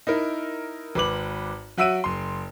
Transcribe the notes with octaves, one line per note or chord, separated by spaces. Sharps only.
D#4 E4 A#4
G#1 B4 D6 F#7
F#3 F#4 E5 E6 D7 D#7
F#1 C6